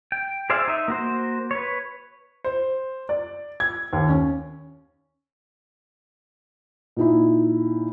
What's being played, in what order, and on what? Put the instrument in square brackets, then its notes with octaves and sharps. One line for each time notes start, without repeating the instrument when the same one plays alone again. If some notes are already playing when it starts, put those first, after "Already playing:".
[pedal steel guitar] G5
G#4 C5 D5 E5 F5
D#4 E5
A#3 F#4 C5
B4 C#5
[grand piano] C5
D5
G#6
D#2
C#4
[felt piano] A#2 D#4 E4